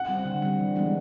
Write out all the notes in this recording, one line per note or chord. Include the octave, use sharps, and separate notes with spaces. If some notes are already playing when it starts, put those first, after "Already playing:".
Already playing: F#5
G3 C4
D3
G3 C4
E3
G#3 B3 D4